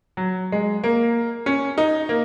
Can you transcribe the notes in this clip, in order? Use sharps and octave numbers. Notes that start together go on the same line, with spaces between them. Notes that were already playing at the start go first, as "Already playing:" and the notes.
F#3
G#3
A#3
C#4
D#4
A#3